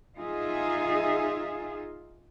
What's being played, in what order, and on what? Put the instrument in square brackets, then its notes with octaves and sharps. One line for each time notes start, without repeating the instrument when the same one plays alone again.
[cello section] D#4 F4 G#4 E5